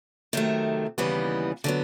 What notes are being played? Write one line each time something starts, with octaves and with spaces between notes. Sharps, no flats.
C3 D#3 F#3 A3
D#2 C#3 E3 G3 B3
D3 F#3 B3